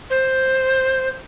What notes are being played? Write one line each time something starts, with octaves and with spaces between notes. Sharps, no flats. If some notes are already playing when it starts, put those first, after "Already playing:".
C5